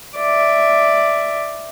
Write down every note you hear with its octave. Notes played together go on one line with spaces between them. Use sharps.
D5 E5